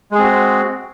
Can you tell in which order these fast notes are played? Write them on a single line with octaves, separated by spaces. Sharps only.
G#3 G#4 C4 F#4